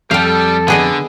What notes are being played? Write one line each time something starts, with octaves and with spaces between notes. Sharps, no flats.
F2 G3 A4 F5 G5
D3 B3 G#4 D#5